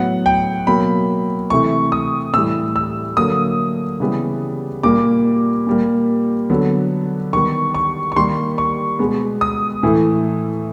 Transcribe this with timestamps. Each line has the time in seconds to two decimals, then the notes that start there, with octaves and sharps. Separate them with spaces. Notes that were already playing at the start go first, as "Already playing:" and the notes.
Already playing: A2 F#3 B3 F#5
0.26 G5
0.67 B2 F#3 A#3 B5
1.50 C3 E3 A3 C#6
1.92 D#6
2.34 A2 E3 G3 E6
2.76 E6
3.17 D3 F#3 A#3 D#6
4.00 C#3 E3 G3 B3
4.83 A#2 G3 A#3 D6
5.66 A#2 G3 A#3
6.50 D3 F#3 B3
7.33 D#3 G3 B3 C#6
7.75 C#6
8.12 C#6
8.16 D#3 G3 A#3 C6
8.58 C#6
8.99 B2 G#3 B3
9.41 D#6
9.83 A2 E3 A3